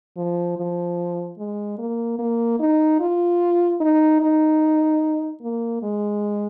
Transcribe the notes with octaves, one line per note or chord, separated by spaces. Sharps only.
F3
F3
G#3
A#3
A#3
D#4
F4
D#4
D#4
A#3
G#3